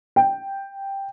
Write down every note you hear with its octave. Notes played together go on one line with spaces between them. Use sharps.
G5